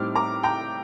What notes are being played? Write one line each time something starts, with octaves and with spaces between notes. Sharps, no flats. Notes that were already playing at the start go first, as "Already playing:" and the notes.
Already playing: A2 G3 C4 D#4 D6 F6
A#5 D6
G5 A#5